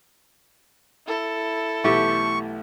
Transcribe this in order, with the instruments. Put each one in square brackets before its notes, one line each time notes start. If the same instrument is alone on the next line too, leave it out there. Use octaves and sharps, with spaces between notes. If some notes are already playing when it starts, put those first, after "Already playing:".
[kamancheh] E4 A4
[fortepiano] B1 E3 [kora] A3 G4 [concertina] C#6